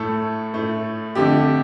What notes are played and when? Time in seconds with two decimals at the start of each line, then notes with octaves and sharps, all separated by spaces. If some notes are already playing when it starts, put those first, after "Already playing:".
Already playing: A2 A3 A4
0.54 A2 A3
1.15 F2 D3 A3 G4